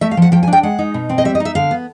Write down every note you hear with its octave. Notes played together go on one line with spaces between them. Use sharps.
A3 E5
F5
F3 F#5
F3 G5
G#5
D4 G5
G#3 F#5
D#4
B2
C4
D#5
G3 E5
D#5
D#4
E5
D3 F5
B3